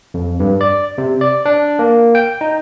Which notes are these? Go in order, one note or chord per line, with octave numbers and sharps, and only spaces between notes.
F2
G2
D5
C3
D5
D4
A#3
G5
D#4